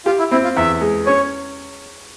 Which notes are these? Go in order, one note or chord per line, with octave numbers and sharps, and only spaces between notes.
F4 G4
E4
C4 E4
F4
E2 E5
G#3
C#4 C#5